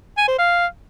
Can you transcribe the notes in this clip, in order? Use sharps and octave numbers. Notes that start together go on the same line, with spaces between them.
G#5
C5
F5